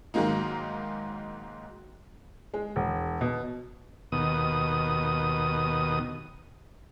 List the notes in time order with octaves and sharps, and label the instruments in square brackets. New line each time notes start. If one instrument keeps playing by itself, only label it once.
[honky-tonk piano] G#2 D#3 F#3 G#3 A#3 D#4
[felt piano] G#3
E1
B2
[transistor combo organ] D#2 B2 D#6